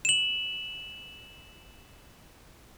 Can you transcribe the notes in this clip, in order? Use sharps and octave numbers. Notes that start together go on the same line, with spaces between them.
E7 F#7